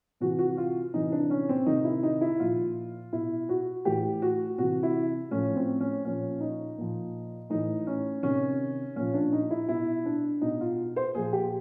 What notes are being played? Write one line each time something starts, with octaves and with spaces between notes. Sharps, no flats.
C3 E3 F#4
F#4
F4
C3 E3 D#4
D4
C#4
C4
C3 D#3 D#4
E4
D#4
E4
A#2 F3 F4
B2 E4
F#4
A2 E3 G4
F#4
C3 E3 F#4
E4
A2 F3 C#4
C4
C#4
A#2 F3 C#4
D#4
A#2 F3
A2 E3 D#4
C#4
C3 D#3 C#4
A#2 F3 C#4
D4
D#4
E4
B2 E4
D4
B2 D#4
F4
C5
A#2 F3 G#4
G4